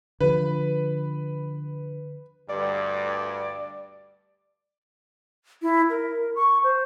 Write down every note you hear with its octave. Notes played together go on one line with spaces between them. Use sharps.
D3 F3 B4
D2 G2 D5
E4
A#4
C#6
C5